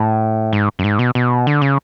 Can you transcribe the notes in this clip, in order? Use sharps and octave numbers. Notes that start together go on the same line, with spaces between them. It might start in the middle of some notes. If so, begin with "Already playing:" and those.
Already playing: A2
G#2
F#2
G#2
B2
B2
D3
C#3